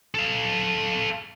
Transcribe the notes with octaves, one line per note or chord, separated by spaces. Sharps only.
A4 F5